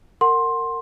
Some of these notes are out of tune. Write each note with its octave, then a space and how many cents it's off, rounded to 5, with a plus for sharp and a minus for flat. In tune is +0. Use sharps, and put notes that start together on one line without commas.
A#4 -25 F#5 +0 C6 +15